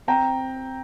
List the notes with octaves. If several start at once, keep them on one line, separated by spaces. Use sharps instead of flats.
C4 G5 A#5